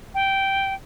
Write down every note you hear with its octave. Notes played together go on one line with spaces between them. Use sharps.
G5